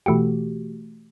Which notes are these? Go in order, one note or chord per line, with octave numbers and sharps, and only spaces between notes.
B2 E3 A3 F#4 G4